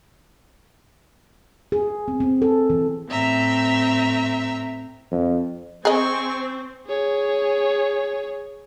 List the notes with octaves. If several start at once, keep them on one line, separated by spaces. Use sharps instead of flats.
G#4
C4
C4
A4
E3
A2 C4 E5 A#5
F2
C4 G#4 D#5 G#5 C#6
G#4 C#5